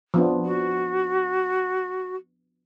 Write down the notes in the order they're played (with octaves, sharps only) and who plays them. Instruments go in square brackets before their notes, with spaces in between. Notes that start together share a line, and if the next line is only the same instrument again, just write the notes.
[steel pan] F3 B3 D4
[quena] F#4